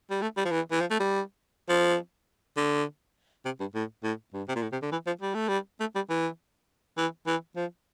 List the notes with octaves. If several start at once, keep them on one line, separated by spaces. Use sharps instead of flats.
G3
A3
G3
F3
E3
E3
F3
A3
G3
F3
D3
C3
G2
A2
A2
G2
C3
A#2
A2
C3
D3
E3
F3
G3
A3
G3
A3
G3
E3
E3
E3
F3